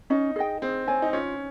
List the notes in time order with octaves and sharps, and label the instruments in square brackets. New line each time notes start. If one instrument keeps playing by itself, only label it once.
[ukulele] C#4 [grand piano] D#4
[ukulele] G#4 D#5 G5
[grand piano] C4 [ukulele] G#4
[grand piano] C4 [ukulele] C#5 G#5
[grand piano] D#4
[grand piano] C#4 [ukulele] F4